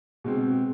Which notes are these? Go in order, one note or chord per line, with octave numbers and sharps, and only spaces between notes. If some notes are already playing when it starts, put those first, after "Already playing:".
B2 G#3 C4